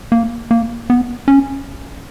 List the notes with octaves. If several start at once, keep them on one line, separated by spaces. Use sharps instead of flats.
A#3
A#3
B3
C#4